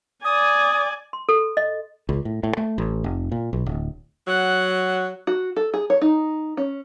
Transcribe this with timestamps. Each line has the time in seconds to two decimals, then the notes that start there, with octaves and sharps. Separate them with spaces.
0.25 D5 G#5 D#6
1.13 C6
1.29 A4
1.57 D#5
2.09 C#2
2.25 A2
2.43 A2
2.57 A3
2.78 A1
3.04 F1
3.32 A#2
3.53 B1
3.66 D1
4.27 F#3 F#5
5.27 F#4
5.57 A4
5.74 G#4
5.90 C#5
6.02 D#4
6.57 C#4